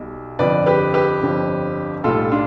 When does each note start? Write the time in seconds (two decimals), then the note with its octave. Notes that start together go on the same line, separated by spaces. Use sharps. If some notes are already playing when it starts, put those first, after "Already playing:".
Already playing: B1 B2 G3
0.39 G1 F2 D3 F3 B4 D5
0.66 G4 B4
0.94 G4 B4
1.22 G1 F2 D3 F3
2.04 B1 A2 G3 F4 A4
2.31 D4 F4